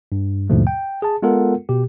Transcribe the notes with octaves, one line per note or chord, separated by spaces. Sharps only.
G2
D#2 G#2 B2 D3 F3 A3
G5
G#4 A5
G#3 B3 F4 A4 A#4 F#5
B2 G4